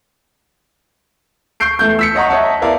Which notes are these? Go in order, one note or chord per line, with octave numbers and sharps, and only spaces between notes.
C#6 G6 C7 D7
E2 A3 G6
E6 B6 C#7
C#5 D#5 F#5 A#5 C#6
C#5 D#5 E5 F#5 A5
B3 E4 A#4 D5 F5